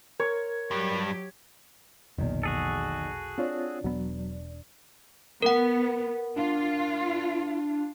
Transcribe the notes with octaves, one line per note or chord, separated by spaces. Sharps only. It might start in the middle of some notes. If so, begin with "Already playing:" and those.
A#4 C#5
G2 F#3 G4
F1 B1 E2 A#2 D#3
F#4 G#4 A4
C4 D4 F4 C#5
E1 F#3 B3
B3 A#4 F#5
D4 F4